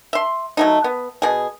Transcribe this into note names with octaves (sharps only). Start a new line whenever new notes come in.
E5 C6
F#3 A3 D#4
B3
B2 G#4